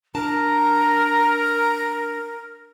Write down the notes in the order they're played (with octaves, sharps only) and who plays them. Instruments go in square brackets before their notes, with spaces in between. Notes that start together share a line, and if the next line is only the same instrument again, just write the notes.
[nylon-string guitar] D4 A5 [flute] A#4 [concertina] A#5